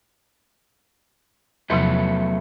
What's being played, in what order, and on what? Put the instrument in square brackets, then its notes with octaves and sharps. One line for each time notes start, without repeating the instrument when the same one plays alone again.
[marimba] E2 C3 F3 [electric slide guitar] F#3 A3 B3